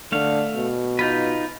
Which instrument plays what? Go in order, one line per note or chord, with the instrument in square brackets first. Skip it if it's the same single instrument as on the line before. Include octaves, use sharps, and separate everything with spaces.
[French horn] D3 [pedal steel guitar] A3 F5
[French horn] B2
[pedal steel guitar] D#4 F4 B4